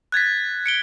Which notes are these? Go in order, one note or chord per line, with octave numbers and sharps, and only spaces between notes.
F#6 G#6 A6 B6
C#7 D7 G7